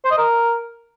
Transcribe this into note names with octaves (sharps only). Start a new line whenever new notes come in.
C5
D#5
A#4